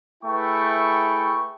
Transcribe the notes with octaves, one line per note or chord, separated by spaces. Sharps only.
A3 E4 G#4 B4 G5 C#6